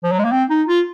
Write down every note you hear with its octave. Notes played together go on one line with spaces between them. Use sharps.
F3
F#3
G#3
A#3
C4
D#4
F4